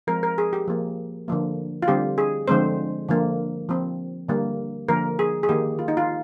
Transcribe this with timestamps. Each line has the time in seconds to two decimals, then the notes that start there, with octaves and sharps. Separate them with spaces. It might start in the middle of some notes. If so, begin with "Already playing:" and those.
0.07 F3 G#3 C4 A#4
0.23 A#4
0.38 G#4
0.53 G4
0.68 F3 A#3
1.28 D3 F3 A#3
1.82 F4
1.88 D3 G3 C4 G4
2.18 G#4
2.48 D3 F3 G#3 C4 C5
3.09 D3 F3 A#3
3.69 F3 C4
4.28 D3 G3 A#3
4.88 D3 F3 A#3 A#4
5.19 G#4
5.43 G#4
5.49 D#3 A#3 G4
5.79 F4
5.88 D#4
5.97 F4